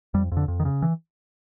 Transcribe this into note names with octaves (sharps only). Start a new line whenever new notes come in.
F2 G3
F2
D3
F2
D#3
C#3
E3